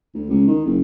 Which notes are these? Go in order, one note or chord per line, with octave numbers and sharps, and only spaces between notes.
D2
C#2
D#3
F#1